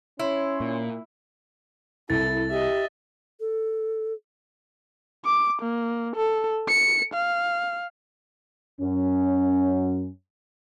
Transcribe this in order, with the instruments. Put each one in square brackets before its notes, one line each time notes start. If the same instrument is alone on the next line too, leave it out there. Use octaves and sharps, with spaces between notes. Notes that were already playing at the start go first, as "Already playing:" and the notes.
[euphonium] C#4 [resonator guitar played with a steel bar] E4 [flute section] C#5 C6
[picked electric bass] A#2
[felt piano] C2 [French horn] E4 [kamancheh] A4 [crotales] A6
[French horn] G4 [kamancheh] D#5 E5
[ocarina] A4
[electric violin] D6
A#3
A4
C#7
F5
[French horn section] F#2 C#4